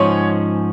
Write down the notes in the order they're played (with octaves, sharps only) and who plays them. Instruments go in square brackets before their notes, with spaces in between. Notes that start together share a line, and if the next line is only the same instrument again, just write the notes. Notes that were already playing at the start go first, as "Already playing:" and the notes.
Already playing: [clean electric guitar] G#2 F3 C#4 G#4 [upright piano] C#5